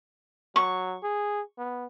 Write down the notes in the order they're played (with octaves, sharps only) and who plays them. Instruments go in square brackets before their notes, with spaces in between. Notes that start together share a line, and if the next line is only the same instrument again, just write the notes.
[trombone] F#3 [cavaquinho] C#6
[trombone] G#4
B3